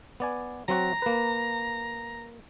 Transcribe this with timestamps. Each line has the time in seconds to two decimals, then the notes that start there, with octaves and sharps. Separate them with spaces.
0.20 B3 D5 G#5
0.68 F#3 C4 F#4 A#5
1.02 A#3 B4